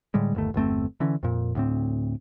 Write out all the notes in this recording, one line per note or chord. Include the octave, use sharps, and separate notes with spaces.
A2 D3 G3 G#3
G1 D#2 A3
G1 E2 A3 C4
D3 E3 C#4
F2 A#2
D2 A2 C4